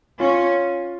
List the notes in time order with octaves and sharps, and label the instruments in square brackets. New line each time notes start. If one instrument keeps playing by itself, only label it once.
[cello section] C#4 [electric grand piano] F4